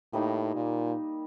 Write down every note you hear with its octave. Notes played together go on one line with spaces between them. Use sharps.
A2 G3 A#3 D#4
A#2